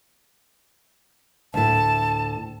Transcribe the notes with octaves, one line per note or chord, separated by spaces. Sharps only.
D2 A2 A5